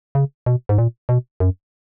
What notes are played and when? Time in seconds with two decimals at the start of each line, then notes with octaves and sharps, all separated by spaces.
0.15 C#3
0.46 B2
0.69 G#2
0.78 A#2
1.09 B2
1.40 F#2